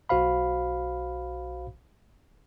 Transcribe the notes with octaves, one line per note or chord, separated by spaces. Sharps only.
B1 F#4 C5 F5 B5